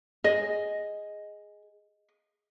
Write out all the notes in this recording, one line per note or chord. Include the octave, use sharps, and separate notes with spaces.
G#4 D#5